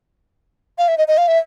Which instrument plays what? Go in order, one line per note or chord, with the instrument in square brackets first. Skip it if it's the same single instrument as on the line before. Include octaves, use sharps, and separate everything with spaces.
[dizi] F5
E5
D#5
D#5
F5
E5